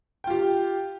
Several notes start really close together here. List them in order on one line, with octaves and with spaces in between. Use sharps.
G5 F4 G4